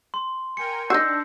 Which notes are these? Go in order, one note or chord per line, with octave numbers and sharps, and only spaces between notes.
C6
A#4 G5 G#5 C#7
D4 D#4 F#4 E6 G6 A#6 C7